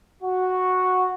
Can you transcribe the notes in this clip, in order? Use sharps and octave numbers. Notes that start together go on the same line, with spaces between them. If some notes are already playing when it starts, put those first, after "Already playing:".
F#4